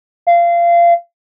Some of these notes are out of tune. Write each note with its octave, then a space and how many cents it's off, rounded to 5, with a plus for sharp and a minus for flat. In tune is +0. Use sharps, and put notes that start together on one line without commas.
F5 -25